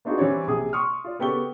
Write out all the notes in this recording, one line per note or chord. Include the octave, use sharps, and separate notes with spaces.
B3 D4 D#4 F4 F#4 G#4
E3 G3 C4 C#4 C#5 D5
A#1 C3 G#4 D#6
C6 C#6 D#6 F6
F4 D5
C#3 B3 G4 A4 C#6 G7